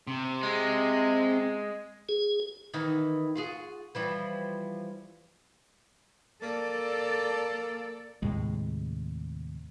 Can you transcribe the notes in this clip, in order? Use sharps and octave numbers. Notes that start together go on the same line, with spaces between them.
C3
G#3
G#4
D#3 E3 D#4
F4 F#4 G#4
E3 F3 G3
A#3 A4 D5
D#2 A2 C3 G#3